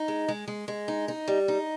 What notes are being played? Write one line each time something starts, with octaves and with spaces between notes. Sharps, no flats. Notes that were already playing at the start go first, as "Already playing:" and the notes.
Already playing: D#4
G#3
G#3
G#3
G#3
D#4
D#4
G3
D#4